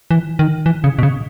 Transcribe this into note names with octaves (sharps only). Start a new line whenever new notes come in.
E3
D#3
E3
C#3
B2
C#3